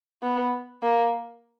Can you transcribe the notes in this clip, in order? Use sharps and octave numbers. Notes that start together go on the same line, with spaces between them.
B3
A#3